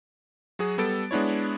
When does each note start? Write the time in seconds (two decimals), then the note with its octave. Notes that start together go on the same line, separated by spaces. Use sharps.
0.59 F#3 F#4 G#4
0.78 G3 B3 A4 A6 D7
1.11 G#3 B3 D4 E4 C#5